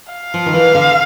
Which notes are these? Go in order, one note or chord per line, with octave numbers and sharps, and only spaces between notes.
F5
F3
D#3
E3
D3